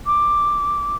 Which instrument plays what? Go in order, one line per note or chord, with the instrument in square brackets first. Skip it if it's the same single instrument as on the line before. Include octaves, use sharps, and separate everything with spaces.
[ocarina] D6